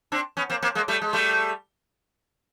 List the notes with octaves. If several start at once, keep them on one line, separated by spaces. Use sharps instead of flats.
C4 D4
B3 C#4
A#3 C4
A#3 C4
G#3 A#3
G3 A3
G#3
G3 A3